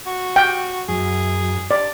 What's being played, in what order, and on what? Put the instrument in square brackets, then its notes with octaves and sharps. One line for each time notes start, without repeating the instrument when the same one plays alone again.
[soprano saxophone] F#4
[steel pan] G5
[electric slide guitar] F#2 [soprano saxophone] G#4
[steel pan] D5